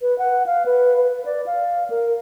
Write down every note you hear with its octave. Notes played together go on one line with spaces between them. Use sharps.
B4
F#5
F5
B4
B4
D5
F5
A#4